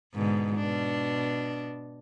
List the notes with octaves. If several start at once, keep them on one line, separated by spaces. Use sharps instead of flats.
G#2 B2 D3
B2 D4